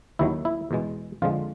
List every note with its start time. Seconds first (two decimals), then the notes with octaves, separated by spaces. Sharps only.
0.19 D#2 D#3 F#3 E4
0.45 E4
0.71 E2 B2 G#3
1.22 F2 D3 F3 G#3 F4